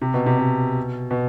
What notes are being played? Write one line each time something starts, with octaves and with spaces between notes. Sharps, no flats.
C3
B2
C3
B2
B2